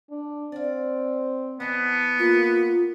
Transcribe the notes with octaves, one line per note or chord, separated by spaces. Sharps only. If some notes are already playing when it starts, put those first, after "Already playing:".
D4
C4 D5 F5
E3 B3 D#5 A5
A#3 F4